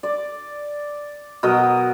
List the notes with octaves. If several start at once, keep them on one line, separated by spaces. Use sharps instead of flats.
D5
B2 F#3 A#4 D#5